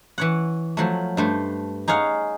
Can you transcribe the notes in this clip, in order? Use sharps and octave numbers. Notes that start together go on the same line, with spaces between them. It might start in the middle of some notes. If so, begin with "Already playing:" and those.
E3 C#5 F#5
F3 F#3 A3
G2 A3 C5
D#4 G#4 C#5 F5 F#5